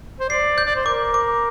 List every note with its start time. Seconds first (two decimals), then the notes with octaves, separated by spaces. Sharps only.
0.20 C5
0.30 D5 C7
0.58 G6
0.65 D5
0.76 C5
0.86 A#4 D6
1.14 D6